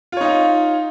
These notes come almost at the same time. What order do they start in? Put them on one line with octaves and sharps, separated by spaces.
F4 C#5 D#4 F5